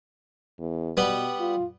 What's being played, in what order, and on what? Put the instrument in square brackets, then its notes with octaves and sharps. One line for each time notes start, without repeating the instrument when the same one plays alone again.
[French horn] E2
[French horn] B2 [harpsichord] G3 B3 B4
[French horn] F4